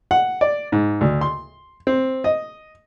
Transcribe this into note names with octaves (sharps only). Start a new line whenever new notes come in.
F#5
D5
G#2
D2
C6
C4
D#5